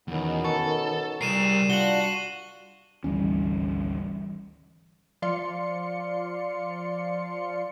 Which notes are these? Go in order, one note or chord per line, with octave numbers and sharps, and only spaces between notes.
E2 B2 D#3 B3 C#4
A4 C#6
C2 G3 G#4 A#4 C7 D#7 E7
D4 F4 F#4 F#7 G7
G#1 D2 E3 G3 C#4
F3 D5 F5 C6 C#7